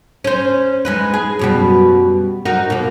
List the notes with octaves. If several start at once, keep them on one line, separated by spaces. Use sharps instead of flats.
C#4 C5
G#3 D#4 B4
G#4
F#2 B2 G3
D#4 F#4 A#4
B2 A#3